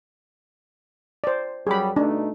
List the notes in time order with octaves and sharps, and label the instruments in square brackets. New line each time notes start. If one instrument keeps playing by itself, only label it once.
[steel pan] C5 D5
[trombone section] F#2 F#3 G3 [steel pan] G#4 B5
[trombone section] B2 A3 D#4 [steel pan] D4